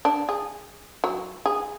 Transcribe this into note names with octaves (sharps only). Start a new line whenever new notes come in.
D4
G#4
F#3
G#4